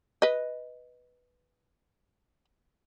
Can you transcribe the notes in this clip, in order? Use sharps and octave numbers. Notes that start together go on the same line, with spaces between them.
B4 D#5